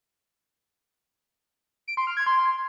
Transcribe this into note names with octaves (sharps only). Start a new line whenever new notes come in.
D7
C6
F6
G#6
C6